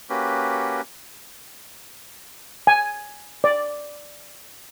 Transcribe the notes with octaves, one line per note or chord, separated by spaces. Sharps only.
A#3 C#4 F#4 G4 B4
G#5
D5